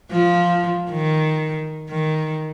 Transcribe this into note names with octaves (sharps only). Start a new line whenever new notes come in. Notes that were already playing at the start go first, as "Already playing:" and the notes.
F3
D#3
D#3